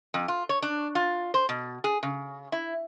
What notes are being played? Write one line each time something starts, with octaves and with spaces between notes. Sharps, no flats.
F2
F4
C#5
D4
F4
C5
B2
G#4
C#3
E4